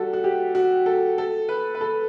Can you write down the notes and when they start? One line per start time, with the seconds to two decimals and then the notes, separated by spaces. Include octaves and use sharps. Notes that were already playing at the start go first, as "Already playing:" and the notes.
Already playing: G3 F#4 A4
0.13 F#4
0.24 G4
0.55 F#4
0.86 A4
1.18 A4
1.49 B4
1.75 B4
1.81 A4